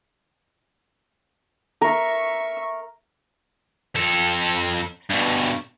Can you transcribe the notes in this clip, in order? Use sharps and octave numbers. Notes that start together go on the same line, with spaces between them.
A#4 E5 C#6
F2 A4
G2 B2